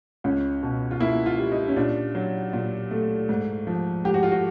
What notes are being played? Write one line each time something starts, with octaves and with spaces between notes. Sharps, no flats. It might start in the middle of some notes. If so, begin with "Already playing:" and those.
C#2 C#4
B2
F4
A#3 E4
F4
G3
D#4
C#4
A#2 D4
F#3
A#2
A3
G#2
F3
G#2 G4
F#4
F4
F#4